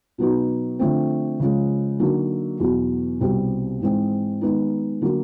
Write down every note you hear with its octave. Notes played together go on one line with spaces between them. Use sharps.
B2 F#3 B3 D#4
D3 F3 A3 C4
C#3 F3 G#3
D3 F#3 A#3 D#4
E2 B2 F#3
C2 B2 G3 C4
G#2 E3 G#3 C4
D#3 G#3 B3 D#4
D3 F#3 A#3